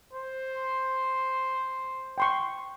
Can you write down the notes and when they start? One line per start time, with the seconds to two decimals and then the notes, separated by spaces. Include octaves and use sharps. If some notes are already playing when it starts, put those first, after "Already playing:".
0.13 C5
2.18 G5 C6 C#6